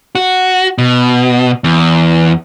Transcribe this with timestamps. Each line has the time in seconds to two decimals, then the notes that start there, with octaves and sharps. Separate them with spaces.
0.15 F#4
0.78 B2
1.64 E2